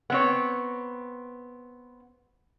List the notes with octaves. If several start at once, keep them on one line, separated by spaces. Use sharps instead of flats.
B3 C4 C#5